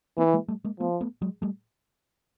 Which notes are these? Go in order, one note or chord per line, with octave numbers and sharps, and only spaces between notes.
E3 A#3 C4
G#3 A#3
G3 A3
G#3 A#3
F3 A3 B3
A3 B3
F#3 G#3
G3 A3